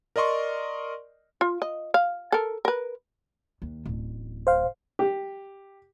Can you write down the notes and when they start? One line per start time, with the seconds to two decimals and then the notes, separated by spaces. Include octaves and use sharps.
0.16 A#4 D5 D#5 C6 C#6
1.41 F4
1.62 D#5
1.94 F5
2.32 A4 A#4
2.65 A#4 B4
3.62 D#2
3.86 D1 A1
4.47 C5 F5
4.99 G4